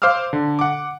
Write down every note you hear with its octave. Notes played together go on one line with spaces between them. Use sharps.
C5 F5 D6 E6 F6
D3
F#5 D6